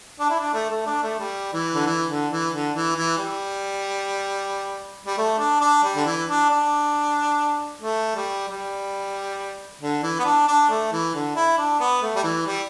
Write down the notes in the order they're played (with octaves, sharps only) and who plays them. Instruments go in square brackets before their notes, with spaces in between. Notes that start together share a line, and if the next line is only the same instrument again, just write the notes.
[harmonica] D4
E4
D4
A3
A3
D4
A3
G3
E3
D3
E3
D3
E3
D3
E3
E3
G3
G3
A3
D4
D4
G3
D3
E3
D4
D4
A3
G3
G3
D3
E3
B3
D4
D4
A3
E3
D3
E4
D4
B3
A3
G3
E3
G3